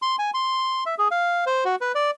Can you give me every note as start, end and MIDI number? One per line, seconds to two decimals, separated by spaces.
0.02 0.16 84
0.19 0.31 80
0.34 0.84 84
0.86 0.95 76
0.98 1.08 68
1.11 1.45 77
1.46 1.64 72
1.65 1.76 66
1.81 1.92 71
1.95 2.11 74